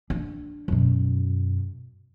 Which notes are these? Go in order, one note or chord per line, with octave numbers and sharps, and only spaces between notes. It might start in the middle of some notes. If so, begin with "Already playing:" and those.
D4
F#2 B2